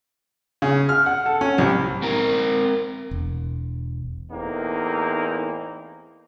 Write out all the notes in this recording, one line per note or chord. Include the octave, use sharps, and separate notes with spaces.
C#3
F6
F#5
A4
C#4
C2
C4 A#4
E1
E2 A2 A#3 C4 D#4